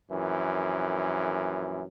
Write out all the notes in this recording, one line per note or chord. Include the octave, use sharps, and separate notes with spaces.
A#1 F#2 E3